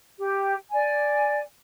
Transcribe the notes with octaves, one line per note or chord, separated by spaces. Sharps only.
G4
D5 G#5